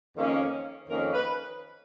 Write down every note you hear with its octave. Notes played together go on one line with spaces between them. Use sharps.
F2 D#3 A#3 C#4
F2 D#3 A#3 C#4 A#4
B4